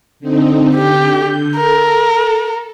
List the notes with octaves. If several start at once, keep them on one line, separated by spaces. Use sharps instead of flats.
D3 C4 D#4
D3 G4 G6
A4 A#4